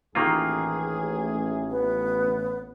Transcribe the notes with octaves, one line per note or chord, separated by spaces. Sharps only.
A1 D#3 A#3 F4 G#4
B3